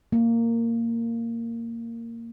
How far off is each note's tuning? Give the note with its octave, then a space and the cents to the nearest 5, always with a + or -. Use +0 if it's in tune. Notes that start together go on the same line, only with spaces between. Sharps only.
A#3 -15